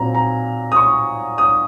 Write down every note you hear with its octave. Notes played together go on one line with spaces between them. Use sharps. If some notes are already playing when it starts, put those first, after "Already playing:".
Already playing: A#2 F#3 C4 A#5
A#5
D#6
C#6
D#6